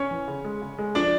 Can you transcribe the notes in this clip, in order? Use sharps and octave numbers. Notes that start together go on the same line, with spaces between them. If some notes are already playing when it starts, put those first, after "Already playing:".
Already playing: C#4 C#5
E3
C#3
G#3
C#3
G#3
F3 D4 D5